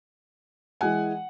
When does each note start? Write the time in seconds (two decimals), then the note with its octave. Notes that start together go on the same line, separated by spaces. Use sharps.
0.81 E3 G#3 F#5 G#5